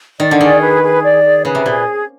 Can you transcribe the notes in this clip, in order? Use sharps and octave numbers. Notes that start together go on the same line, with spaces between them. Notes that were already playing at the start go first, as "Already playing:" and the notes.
D#3 D5
D3
D#3 G#4
B4
G#4
D5
G#4
C#3 B4
C3
A#2 G#4